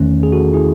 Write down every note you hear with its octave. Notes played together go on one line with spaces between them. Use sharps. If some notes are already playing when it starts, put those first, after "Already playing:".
Already playing: E2 D#3 A3 C#4
G#4
F#4 A4
E4 G#4